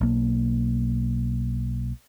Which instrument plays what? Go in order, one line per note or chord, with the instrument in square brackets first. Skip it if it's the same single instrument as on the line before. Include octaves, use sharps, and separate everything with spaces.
[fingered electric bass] B1 A#3